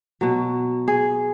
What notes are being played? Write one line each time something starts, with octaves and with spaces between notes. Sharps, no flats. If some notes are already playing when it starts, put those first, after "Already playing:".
B2 F#3
G#4